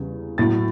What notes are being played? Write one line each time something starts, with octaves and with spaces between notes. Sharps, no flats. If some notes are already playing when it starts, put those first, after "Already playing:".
Already playing: E2 C#3 G3
A2 F#3 A6